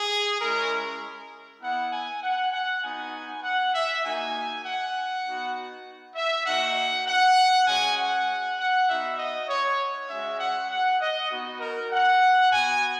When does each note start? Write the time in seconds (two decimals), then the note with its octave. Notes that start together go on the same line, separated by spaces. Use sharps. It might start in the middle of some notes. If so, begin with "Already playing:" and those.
Already playing: G#4
0.41 G#3 C#4 E4 A#4
1.62 B3 E4 F#5
1.93 G#5
2.22 F#5
2.52 F#5
2.83 B3 D#4 F#4 G#5
3.43 F#5
3.74 E5
4.03 A#3 D#4 F#4 G#5
4.64 F#5
5.25 B3 D#4 F#4
6.15 E5
6.46 A#3 D#4 F#4 F#5
7.07 F#5
7.67 G#3 C#4 F#4 G#5
7.97 F#5
8.58 F#5
8.88 B3 D#4 F#4 E5
9.18 D#5
9.49 C#5
10.08 G#3 C#4 F#4 E5
10.39 F#5
10.70 F#5
11.00 D#5
11.30 B3 D#4 F#4
11.60 A#4
11.90 F#5
12.51 B3 F#4 G#5